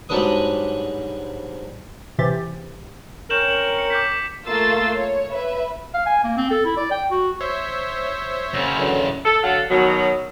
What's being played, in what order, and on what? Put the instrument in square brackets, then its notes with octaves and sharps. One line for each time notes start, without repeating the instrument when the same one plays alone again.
[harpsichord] G#2 F#3 G3 D4 B4 D#6
[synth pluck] C3 E3 G4 A6
[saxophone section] C4 C#4 A#4 [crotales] G6 E7 F#7
[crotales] F#7
C#7
D6 G6 B6
[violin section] A3 A#3 F4 C6 E6 A6
C#5
B4 E5
[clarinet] F5
G#5
A#3
C4
A4
E4
D5
G5
F#4
[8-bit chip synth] C5 C#5 E5
[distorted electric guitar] F#2 C#3
[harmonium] D3 E3 F#3
[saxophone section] A4
D3 F#3 A4 F5 F#5
B2 D#3 F#3